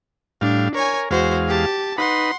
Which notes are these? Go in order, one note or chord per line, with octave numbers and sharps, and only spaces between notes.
A2 G3 D4 F5
A#4 C#5 G#5
E2 G#3 F#4 C5 F5
G4 A5
D#4 B4 F#5 B5 C6